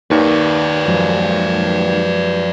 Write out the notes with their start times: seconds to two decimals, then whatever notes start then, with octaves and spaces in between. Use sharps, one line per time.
0.11 D#2 D#3 B4 C#5 D5
0.85 F#2 F3 G#3